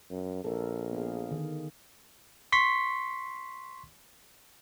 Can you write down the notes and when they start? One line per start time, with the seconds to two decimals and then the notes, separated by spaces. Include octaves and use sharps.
0.10 F#2
0.44 A#1 A4 A#4
0.92 B3 G#4 F5
1.31 D3 D#3
2.52 C6 C#6 B6